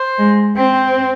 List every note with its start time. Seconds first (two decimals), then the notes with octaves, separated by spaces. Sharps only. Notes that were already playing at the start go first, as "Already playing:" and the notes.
Already playing: C5
0.18 G#3
0.57 C4 C5